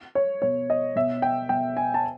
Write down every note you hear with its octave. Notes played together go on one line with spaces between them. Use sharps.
C#5
B2 C#5
D#5
B2 E5
G5
B2 G5
G#5
A5